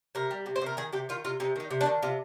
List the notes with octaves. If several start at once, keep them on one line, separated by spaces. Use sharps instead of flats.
C3 A#4
G3
C3
C5
C3 A#4
D#3 G#4
C3 G4
D#3 F4
C3 F4
C3 D#4
D#3 D#4
C3
D4
D#3
C3 F4